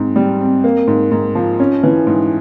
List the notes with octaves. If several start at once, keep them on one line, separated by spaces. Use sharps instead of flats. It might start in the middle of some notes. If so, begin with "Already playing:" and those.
Already playing: G#2 C4
G3
C4
A#3
G#2
G#2
F3
C#4
E3
G#2